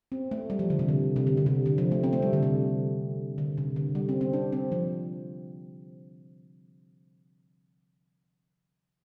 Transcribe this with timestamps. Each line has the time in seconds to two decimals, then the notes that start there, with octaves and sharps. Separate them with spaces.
0.12 C4
0.31 A3
0.50 G3
0.59 F3
0.70 D3
0.79 C3
0.88 D3
1.16 C3
1.27 D3
1.37 D3
1.46 C3
1.66 D3
1.78 F3
1.91 A3
2.03 C4
2.13 A3
2.22 G3
2.33 D3
2.43 C3
3.38 D3
3.58 C3
3.76 D3
3.95 G3
4.09 C4
4.21 C4
4.33 D4
4.52 C4
4.72 F3